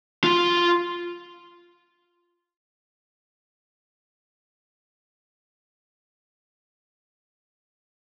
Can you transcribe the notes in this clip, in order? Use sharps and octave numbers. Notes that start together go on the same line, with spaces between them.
F4